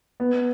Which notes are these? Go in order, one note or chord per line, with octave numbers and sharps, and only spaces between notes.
B3